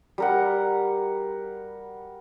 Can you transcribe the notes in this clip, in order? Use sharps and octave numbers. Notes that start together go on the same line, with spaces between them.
G3 A#4 F#5